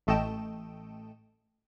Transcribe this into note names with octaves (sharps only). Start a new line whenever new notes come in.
A1 A3 A4 D#5 G5 E7